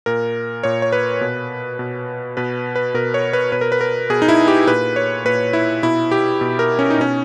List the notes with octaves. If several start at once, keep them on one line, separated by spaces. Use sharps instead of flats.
A#2 A#4
A#2 C#5
C#5
B4
B2
B2
B2 B4
B4
B2 A#4
C#5
B4
B2 B4
A#4
B4
A#4
B2 G#4
D#4
E4
G4
A#2 B4
C#5
A#2 B4
E4
B2 E4
G4
B2
A#4
C#4
D#4
B2 C#4